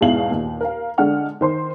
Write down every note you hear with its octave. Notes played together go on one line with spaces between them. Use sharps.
E2 G#2 B2 E4 F5 F#7
D#2 A#2
A#4 F5
D3 G#3 D4 F#5 F6
D#3 C5 C6